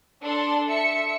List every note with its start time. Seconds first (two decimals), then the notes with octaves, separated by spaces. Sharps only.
0.21 D4 A4 C6
0.68 E5 C#7